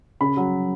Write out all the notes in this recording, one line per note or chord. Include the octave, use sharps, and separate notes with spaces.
C#3 B5
F#3